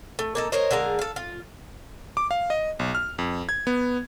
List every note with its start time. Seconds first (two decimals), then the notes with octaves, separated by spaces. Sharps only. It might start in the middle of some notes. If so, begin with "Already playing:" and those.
0.19 A3
0.35 A#3 D#4 A4
0.52 A#4 C5 C#5 D#5
0.71 D3 G#3 A#4 F5
0.99 A4 F5
1.16 F4
2.17 D6
2.31 F5
2.50 D#5
2.79 B1
2.95 F6
3.19 F2
3.49 G#6
3.67 B3